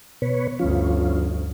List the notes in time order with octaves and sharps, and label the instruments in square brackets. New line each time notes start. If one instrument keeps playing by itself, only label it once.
[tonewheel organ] B2 B4 C#5
[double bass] G1 D2 [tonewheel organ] F3 C#4 F4